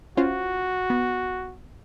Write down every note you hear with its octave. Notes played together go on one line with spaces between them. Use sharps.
C#4 F4 F#4 C5
B3